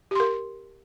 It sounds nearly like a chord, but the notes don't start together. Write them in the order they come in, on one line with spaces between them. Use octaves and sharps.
G4 C6 A#4